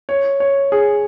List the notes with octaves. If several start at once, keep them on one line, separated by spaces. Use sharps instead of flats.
C#5
C#5
G#4